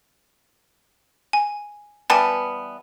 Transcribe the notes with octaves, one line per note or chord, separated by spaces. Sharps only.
G#5
E3 G3 B3 G#5 A5